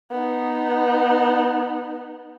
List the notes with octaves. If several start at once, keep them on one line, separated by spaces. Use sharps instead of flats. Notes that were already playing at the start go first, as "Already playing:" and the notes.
B3 D#4